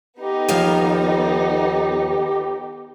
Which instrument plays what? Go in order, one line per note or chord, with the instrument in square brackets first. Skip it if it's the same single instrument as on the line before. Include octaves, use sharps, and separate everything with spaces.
[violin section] B3 D#4 A4 [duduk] G4
[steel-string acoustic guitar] D#2 F3 F5